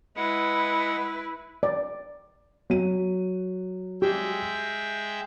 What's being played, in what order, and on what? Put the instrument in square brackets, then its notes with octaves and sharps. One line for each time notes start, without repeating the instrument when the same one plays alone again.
[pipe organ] G#3 F#5 [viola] E4 B4
[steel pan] D5
[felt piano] F#3 D#7
[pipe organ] G#3 E5 G5 [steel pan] G4